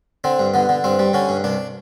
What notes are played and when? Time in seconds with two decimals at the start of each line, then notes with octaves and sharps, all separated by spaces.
0.24 D3 C4
0.39 G2
0.54 D3 B3
0.69 D3
0.84 G2 C4
0.99 G3
1.14 D3 C#4
1.29 G2
1.44 C2 D4